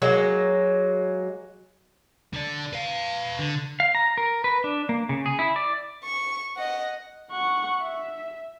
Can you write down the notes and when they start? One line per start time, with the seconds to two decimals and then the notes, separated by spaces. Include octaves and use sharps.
0.02 F#3 G#3 A#3
2.33 D3 D5
2.73 B4 F5
3.39 D3
3.80 F5
3.95 A#5
4.18 A#4
4.44 B4
4.64 D4
4.89 A#3
5.09 C#3
5.26 G#4
5.39 E4
5.56 D5
6.03 C#6
6.56 D#5 F#5
7.31 F#5 C#6
7.81 E5